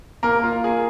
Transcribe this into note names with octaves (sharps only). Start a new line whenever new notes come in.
A#3 A#4
F4
G#4